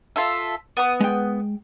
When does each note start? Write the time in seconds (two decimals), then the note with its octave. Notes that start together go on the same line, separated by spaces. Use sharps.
0.16 F4 A4 E5
0.77 B3 D#6
1.00 G#3 G5